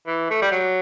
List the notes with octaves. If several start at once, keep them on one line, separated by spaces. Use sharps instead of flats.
E3
A3
G3
F#3